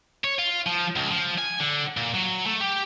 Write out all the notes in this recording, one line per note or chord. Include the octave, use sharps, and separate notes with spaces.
C#5
F4
F3
C#2
F3
G#5
D3
A#2
F#3
A3
G4